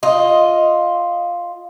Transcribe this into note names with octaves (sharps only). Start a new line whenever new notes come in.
F4 D#5